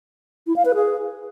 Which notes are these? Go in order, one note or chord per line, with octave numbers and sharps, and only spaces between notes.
E4
F5
B4
G#4